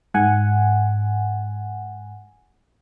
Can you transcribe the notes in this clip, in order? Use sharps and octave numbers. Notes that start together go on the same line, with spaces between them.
G#2 F#5 G#5